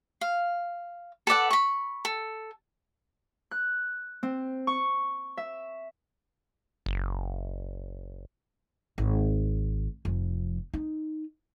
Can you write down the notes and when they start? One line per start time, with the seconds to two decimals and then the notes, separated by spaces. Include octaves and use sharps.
0.21 F5
1.27 A4 B4 D5 F#5
1.51 B5 C#6
2.05 A4
3.51 F#6
4.23 C4
4.67 C#6
5.37 E5
6.86 F#1
8.98 G#1
10.05 F1 F3
10.74 D#4